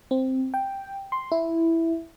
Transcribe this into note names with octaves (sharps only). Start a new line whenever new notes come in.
C4
G5
C6
E4